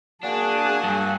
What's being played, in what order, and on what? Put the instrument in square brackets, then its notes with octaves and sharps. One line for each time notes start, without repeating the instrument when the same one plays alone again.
[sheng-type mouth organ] A#3 F#4 F#5 [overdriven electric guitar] D4 [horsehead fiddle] G#4 A5 [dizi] G#5
[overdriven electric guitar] G2